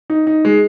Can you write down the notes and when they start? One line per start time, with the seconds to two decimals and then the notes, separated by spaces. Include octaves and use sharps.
0.10 D#4
0.27 D#4
0.45 G#3